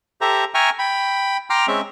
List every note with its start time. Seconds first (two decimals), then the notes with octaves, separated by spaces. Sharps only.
0.21 G4 A4 C5 E5 A#5
0.54 E5 G5 G#5 A#5 C#6 F6
0.79 G5 B5
1.50 G5 A#5 C6 D6 F6
1.68 G#3 C4 C#4 E5